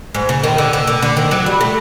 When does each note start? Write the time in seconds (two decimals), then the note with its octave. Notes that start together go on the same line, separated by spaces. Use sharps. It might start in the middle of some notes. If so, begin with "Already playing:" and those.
0.15 G#2
0.29 C#3
0.44 D#3
0.58 D3
0.73 D3
0.87 D3
1.02 D3
1.17 D#3
1.31 F#3
1.46 G3
1.61 A3